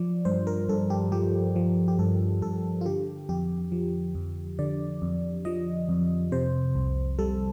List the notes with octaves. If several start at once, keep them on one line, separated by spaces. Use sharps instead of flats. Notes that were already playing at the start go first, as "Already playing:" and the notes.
Already playing: F3 D5
G2 C5
A#4
G2 A4
G4
F3 G4
F3
G4
G2 A4
G2 A4
F4
D3 G4
F2 G4
F3
F2
D3 D5
F2
F3 D#5
F2
C3 C5
C2
G3 A4